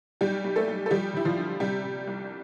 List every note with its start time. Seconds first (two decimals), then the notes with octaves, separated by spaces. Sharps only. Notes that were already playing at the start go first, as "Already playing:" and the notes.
0.21 B1 G3 G4
0.44 B1
0.56 A3 A4
0.68 B1
0.86 A4
0.91 F3 G3 G4
1.14 F3
1.17 E4
1.25 F3 F4
1.37 D3
1.60 C3 G3 G4
1.84 C3
2.07 C2